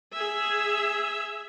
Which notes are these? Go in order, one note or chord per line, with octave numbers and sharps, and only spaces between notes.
G#4 E5